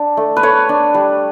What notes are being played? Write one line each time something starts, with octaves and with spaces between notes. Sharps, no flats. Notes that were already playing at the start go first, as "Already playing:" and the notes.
Already playing: D4
A3
B4
A3 C#5
D4
G3